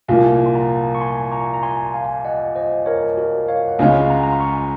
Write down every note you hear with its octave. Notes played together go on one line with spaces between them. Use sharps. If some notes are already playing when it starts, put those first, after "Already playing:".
C2 A#2 F3 A#3 F5 G#5
C6
F#5 A#5
C#6
G#5 C6
A#5 C#6
A#5
G#5 C6
F5 G#5
D#5 F#5
C5 D#5
A#4 C#5
F#4 A#4
C#5 F5
F#5
C#2 C#3 G#3 C#4 F5 G#5
F#5 A#5
A#5
C6
A#5 C#6